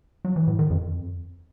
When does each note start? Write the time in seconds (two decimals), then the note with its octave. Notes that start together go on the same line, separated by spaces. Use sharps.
0.25 F#3
0.36 E3
0.47 A2
0.59 D#3
0.70 F2